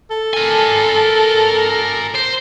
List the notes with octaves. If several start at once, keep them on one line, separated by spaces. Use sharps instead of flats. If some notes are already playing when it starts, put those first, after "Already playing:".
A4
A#4 G#5
C5